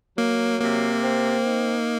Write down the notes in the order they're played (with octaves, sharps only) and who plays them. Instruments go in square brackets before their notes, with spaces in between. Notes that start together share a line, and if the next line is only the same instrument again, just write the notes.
[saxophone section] F#3 [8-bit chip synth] A#3
[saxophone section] C3 [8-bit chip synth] A#3
[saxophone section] C4
D#4